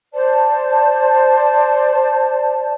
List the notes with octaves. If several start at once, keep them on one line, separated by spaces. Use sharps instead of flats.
C5 D5 A5